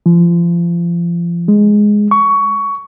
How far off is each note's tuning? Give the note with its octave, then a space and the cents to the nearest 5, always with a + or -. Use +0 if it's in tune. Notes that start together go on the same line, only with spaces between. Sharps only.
F3 -30
G#3 +0
C#6 +15